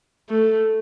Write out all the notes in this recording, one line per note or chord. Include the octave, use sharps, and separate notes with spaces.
A3